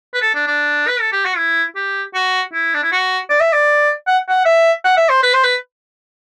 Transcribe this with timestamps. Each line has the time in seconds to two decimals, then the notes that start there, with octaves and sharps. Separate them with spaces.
0.14 B4
0.22 A4
0.35 D4
0.47 D4
0.88 B4
1.01 A4
1.13 G4
1.25 F#4
1.37 E4
1.76 G4
2.15 F#4
2.53 E4
2.74 D4
2.83 E4
2.92 F#4
3.30 D5
3.41 E5
3.53 D5
4.07 F#5
4.29 F#5
4.46 E5
4.85 F#5
4.97 E5
5.09 C5
5.23 B4
5.34 C5
5.44 B4